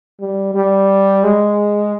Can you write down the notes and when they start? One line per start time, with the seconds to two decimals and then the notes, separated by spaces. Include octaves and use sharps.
0.21 G3
0.55 G3
1.24 G#3